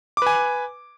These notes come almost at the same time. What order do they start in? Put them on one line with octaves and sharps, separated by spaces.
D6 B4 G#5